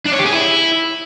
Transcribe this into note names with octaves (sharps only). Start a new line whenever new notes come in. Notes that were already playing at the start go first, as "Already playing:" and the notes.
D4
C#5
G4
G#4
E4